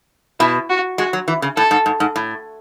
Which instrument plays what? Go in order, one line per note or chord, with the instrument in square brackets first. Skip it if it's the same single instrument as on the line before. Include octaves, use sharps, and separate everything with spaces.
[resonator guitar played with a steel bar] B2 [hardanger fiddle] E4
[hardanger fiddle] F#4
[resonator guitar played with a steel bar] G#3 [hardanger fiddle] F#4
[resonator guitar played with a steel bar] F#3
E3
C#3
[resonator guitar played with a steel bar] A2 [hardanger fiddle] A4
[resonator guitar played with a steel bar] G#2
G#2
G#2
A2